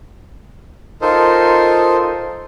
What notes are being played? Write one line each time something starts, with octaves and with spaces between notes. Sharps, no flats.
D#4 F4 A4 A#4 C5 D#5